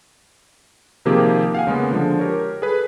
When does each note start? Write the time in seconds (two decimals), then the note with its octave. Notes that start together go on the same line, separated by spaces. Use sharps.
1.05 C3 D#3 F3 A#3 G4 G#4
1.55 F5 F#5 G#5
1.67 C#3 G#3 A#3 B3
1.91 D3 F3 G#3
2.19 G4 A#4 C#5
2.62 G#4 A4 B4